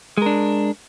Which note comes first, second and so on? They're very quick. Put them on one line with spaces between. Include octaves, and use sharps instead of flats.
G#3 A#4 D4